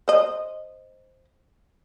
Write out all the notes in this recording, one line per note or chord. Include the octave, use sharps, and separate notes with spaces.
C5 D#5